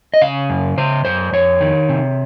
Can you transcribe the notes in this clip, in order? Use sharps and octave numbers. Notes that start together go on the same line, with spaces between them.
D#5
C#3 F5
F#2
C#3 C5
F#2 C5
F2 C#5
D#3
C3